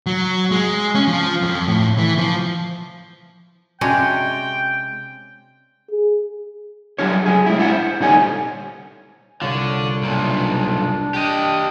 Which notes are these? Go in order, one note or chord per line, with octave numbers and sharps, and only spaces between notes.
F#3
G#3
C#4
F3
F2
A2
E3
F3
C3 G#3 C#4 D4 F#4 G5
G#4
F#3 G3 D4 C#5
F#3 G#4
G#3 E4
D4 E4 E5 F#5
C5
A#2 D3 G3 D#4 C#5 G#5
C2 D3 F4 C#5
B1 A#2 D4
G4 D#5